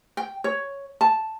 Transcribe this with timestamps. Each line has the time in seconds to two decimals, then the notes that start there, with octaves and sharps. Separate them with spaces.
0.17 G5
0.44 C#5
1.01 A5